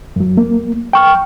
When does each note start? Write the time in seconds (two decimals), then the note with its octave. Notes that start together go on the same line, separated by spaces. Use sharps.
0.16 F#2 F#3
0.37 A#3
0.93 G5 C#6 F6